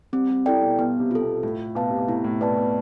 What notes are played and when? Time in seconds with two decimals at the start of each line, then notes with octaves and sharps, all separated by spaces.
0.13 G3 C4
0.30 G3
0.45 G3 E4 A4 D5 G5
0.62 B2
0.79 B2 B3
1.00 C3
1.11 F4 A4
1.22 B2
1.43 A2 F4
1.75 B2 B4 F5 A5
1.90 C3
1.98 B2
2.08 A2 E4
2.24 A2
2.41 B2 B4 D5 A5
2.57 B2